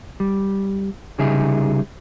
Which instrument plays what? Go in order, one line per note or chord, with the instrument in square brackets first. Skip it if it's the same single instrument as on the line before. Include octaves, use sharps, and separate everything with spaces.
[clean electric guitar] G3
C2 C#3 G3 D#4 G#4 E5